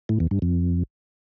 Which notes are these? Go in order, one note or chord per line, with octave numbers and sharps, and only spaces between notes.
A2
E2
G2
F2